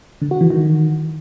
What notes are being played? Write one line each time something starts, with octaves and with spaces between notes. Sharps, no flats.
D3
F#4
E3
D#3